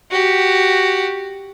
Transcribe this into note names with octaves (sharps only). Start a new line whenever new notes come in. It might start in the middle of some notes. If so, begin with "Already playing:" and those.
F#4 G4